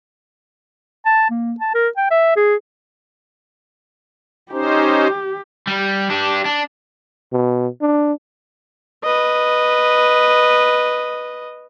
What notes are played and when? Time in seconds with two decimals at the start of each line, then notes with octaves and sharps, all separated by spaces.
1.05 A5
1.30 A#3
1.60 A5
1.74 A#4
1.97 G5
2.10 E5
2.36 G#4
4.52 C#4 D#4 G4 C5
5.67 G3
6.10 D4 G4
6.45 D4
7.32 B2
7.81 D4
9.04 B4 D#5